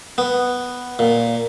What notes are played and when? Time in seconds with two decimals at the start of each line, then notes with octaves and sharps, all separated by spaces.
0.18 B3
0.99 A#2